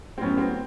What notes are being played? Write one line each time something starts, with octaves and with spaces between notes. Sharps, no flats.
C4
A2 F#3 B3 C#4
C4